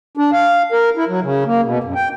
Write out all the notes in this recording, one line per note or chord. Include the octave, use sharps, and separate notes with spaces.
D4
F5
A#4
E4
F#3
C#3
A#3
B2
F#2
G5